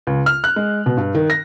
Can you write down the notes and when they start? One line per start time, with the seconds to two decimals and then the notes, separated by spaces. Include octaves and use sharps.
0.07 C#2
0.26 F6
0.44 F#6
0.56 G#3
0.86 B2
0.97 G2
1.15 D#3
1.30 A#6